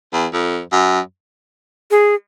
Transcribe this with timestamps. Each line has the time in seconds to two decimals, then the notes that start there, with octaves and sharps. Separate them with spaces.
0.13 E2
0.33 F2
0.72 F#2
1.91 G#4